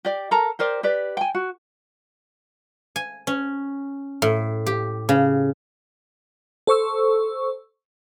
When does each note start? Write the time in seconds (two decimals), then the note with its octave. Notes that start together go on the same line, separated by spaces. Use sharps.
0.05 G4 D5
0.31 A4 A#4 A5 A#5
0.59 G4 A#4 C5 D5
0.83 G4 B4 D5
1.17 G5 G#5
1.35 F#4
2.96 G#5
3.27 C#4
4.22 A2
4.66 G4
5.09 C#3
6.67 A4 C5 C#6 E6